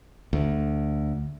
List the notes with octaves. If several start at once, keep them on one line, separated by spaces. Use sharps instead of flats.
D2